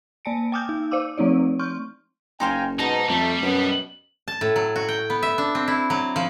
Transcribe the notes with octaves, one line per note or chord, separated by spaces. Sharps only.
A#3 D5 G#5 A5 C#7 D7
G5 G#5 D6 D#6 F6 G6
D#4
C5 D5 F5 D6 E6
F3 A3 C4 D#4 C#5 D5
C6 C#6 F6 G6
F#1 D#4 C5 F5 G5 G#5
G#2 B2 D#4 A5 A#5
F2 G3 A3
F#2 B2 F#3 B3
A5
A2
F#3
F#4
G5
B3
E5
D4
C4
E4
F#3
F3